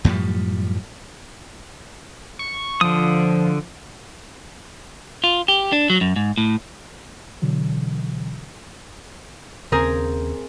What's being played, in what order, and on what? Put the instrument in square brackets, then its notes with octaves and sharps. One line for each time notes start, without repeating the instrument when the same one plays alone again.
[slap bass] F#2 A2 F3 G3
[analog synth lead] C#6
[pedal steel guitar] D3 D#6 [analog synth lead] F3
[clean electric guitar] F4
G4
D4
F#3
F#2
G#2
A2
[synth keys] B2 D3 E3 F#3
[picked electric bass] D#2 C#3 [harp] C4 G#4 A#4